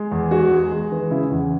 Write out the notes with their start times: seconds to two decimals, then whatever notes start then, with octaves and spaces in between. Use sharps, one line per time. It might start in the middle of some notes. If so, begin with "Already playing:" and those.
Already playing: G#3
0.12 E2
0.31 G#3 F#4
0.51 G#3
0.72 G#3
0.92 E3
1.11 C#3 E4
1.31 E2